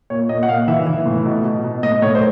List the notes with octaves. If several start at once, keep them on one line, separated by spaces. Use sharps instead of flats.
A#2 C#5
A#2 D#5
F#5
A#2 F5
E3 E5
E3
A2
B2
B2
B2
A2 D#5
A2 C#5
C5